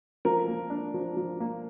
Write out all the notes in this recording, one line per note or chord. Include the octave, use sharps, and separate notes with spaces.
F3 A#4
A#3
D4
F3
F3
A#3